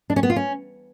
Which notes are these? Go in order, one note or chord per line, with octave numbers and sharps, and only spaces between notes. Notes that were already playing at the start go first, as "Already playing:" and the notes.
D4
C#4
B3
F4
C#4